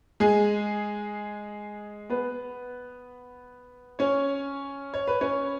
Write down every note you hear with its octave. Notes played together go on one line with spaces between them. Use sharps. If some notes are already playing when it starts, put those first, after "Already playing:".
G#3 G#4
B3 B4
C#4 C#5
C#5
B4
C#4 C#5